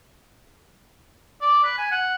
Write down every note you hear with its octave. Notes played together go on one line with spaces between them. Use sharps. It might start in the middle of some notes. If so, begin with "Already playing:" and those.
D5
B4
G#5
F#5